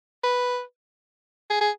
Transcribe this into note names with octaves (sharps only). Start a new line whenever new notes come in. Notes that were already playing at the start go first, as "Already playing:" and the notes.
B4
G#4
G#4